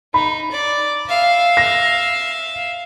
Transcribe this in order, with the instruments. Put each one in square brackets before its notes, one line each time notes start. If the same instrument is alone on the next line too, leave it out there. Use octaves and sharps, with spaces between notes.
[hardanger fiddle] D#4 [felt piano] B5
[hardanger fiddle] D5
E5 F5
[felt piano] A#6